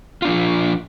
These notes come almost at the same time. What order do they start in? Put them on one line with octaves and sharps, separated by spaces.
F4 D4 F3